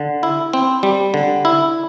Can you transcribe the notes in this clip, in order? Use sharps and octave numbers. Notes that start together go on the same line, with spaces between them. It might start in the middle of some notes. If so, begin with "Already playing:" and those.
Already playing: D3
E4
C4
G3
D3
E4